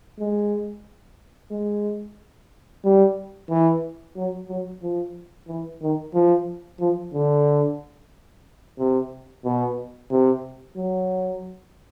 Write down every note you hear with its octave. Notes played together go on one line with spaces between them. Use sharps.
G#3
G#3
G3
E3
F#3
F#3
F3
E3
D#3
F3
F3
D3
C3
B2
C3
F#3